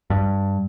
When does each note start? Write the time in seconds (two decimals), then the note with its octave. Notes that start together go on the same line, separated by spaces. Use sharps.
0.10 G2